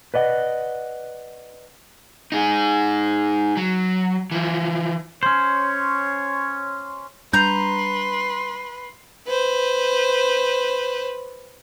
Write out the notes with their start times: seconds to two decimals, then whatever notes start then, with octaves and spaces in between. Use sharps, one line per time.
0.14 B4 D5 D#5 F#5
2.32 D#4 G#4
3.57 F#3
4.31 E3 F3
5.23 C#4 C5 C#5 C6
7.33 G3 D4 B4 A#5 C6 G6
9.27 B4 C5